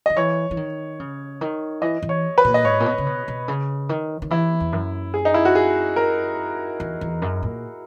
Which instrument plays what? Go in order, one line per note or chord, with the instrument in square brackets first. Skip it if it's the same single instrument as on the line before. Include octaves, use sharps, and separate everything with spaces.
[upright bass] D#3 [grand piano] D#5
[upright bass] E3 [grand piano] C#5
[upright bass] E3
D#3
C#3
D#3
[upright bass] E3 [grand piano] D#5
[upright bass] E3
[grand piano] C#5
B4
[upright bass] A#2
[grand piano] D#5
[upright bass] G#2 [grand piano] C#5
[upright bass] A#2
B2
C#3
B2
B2
C#3
D#3
D#3
[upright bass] E3 [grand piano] E4
[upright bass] E2
F#2
[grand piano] G#4
D#4
E4
F#4
G#4
A#4
[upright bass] E2
E2
F#2
A#2